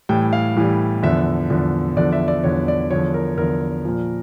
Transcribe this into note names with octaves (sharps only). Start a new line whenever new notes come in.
A2 E3 G3 G5
F5
A2 E3 G3
E2 D3 F3 E5
E2 D3 F3
E2 D3 F3 D5
E5
D5
E2 D3 F3 C#5
D5
E2 D3 F3 C#5
A#4
E2 D3 F3 A#4
A#2 F3